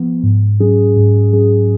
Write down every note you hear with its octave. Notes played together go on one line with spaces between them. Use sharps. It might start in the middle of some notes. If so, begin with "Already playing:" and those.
Already playing: F3 B3
G#2
F#3 C#4 G#4
G#2
F#3 C#4 G#4